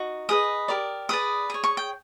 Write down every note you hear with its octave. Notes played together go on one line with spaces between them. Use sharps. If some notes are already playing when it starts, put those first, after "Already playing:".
Already playing: D#4 F#4
G#4 B4 D#5 D#6
G4 A#4 D5
G#4 B4 D5 D#6
G#4 C#5
C#6
G5